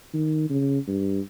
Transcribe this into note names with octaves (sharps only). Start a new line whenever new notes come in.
D#3
C#3
G2